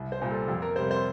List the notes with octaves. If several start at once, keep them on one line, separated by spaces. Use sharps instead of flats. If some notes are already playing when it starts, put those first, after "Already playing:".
Already playing: C2
C5
A#2 G3
A4
F2 G4
A#4
C3 G3 C5
C5